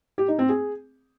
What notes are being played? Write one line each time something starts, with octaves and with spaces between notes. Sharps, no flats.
G4
D#4
C4
G#4